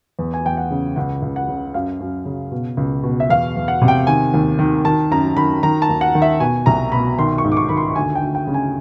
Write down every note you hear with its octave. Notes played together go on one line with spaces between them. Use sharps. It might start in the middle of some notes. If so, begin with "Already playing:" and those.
E2
G#5
E2 G5
F#5
C#3
C#2 F#5
C#2
F#5
C#3
F#2 F5
F#2
C#3
B2
C#2
B2
E5
E2 F5
E2
F#5
C3
G5
D#3 G#5
D#2
D#3
D#3 A5
F#2 A#5
D#3 B5
D#3 A#5
A5
D#2
F#5
D#3
E5
B2 G#5
C2 A#5
B2 B5
D#3 C6
C#6
G#2
D6
C#6
D#3 B5
C6
D2 G#5
G5
D2
G5
C#3
G#5